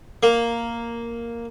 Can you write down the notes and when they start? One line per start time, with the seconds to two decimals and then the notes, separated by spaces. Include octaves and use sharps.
0.23 A#3